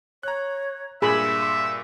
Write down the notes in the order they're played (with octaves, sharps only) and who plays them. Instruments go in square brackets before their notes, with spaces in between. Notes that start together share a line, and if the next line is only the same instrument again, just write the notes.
[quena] C#5 [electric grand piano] A#5 F#6
[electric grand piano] G2 A#2 [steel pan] G#4 B5 [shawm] E5 [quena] C6